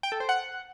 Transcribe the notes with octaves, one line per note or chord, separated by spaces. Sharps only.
G5
A4
C5
F#5